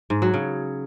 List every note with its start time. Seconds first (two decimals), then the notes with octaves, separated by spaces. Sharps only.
0.10 G#2
0.22 F#3
0.34 C#3